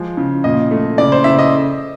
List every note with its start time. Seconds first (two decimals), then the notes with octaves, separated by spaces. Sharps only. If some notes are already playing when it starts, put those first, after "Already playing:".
Already playing: F3 G#3
0.17 C#3
0.44 A#2 D#5
0.71 A3
0.98 C#3 D5
1.12 C5
1.24 C#3 E5
1.39 D#5